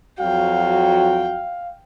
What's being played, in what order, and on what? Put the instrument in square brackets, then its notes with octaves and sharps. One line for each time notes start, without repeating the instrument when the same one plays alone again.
[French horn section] F2 F#3 F#4 [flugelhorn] F5 [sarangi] G5